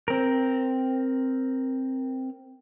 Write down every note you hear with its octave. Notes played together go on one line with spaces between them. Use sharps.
C4 A#4